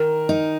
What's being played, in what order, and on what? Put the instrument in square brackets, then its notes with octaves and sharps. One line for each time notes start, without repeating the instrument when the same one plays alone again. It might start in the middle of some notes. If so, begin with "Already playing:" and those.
Already playing: [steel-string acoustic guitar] D#3 [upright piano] A#4
[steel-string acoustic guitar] D#4